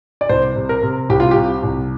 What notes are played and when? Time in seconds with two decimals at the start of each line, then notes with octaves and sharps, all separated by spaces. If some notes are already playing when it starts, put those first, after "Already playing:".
0.21 D5
0.29 C2 C5
0.56 C3
0.69 A#4
0.83 C3
1.09 C2 G4
1.20 F4
1.31 G4
1.36 C3
1.63 C2